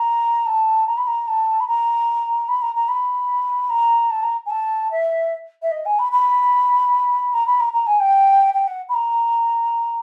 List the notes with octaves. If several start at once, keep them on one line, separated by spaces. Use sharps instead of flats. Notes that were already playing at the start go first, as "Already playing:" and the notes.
Already playing: A#5
A5
A#5
B5
A#5
A5
B5
A#5
B5
A#5
A#5
B5
A#5
A5
A#5
G#5
A5
E5
E5
D#5
G#5
B5
B5
A#5
B5
A#5
A#5
G#5
G5
G5
F#5
B5
A#5